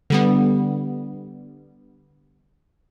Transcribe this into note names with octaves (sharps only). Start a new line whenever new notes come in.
D3 G3 B3